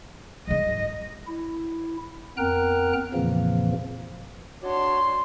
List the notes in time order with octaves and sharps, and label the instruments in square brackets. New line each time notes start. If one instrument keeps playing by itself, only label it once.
[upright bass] G#2 F#3 [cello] D#5
[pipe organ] E4
F2 B3 A#4 G5 A#5 F#6
F2 A#2 C#3 E3 F3 A#3
[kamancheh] D4 C6 [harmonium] F#4 C#5